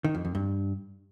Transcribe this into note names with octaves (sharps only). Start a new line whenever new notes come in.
D#3
F2
F2
G2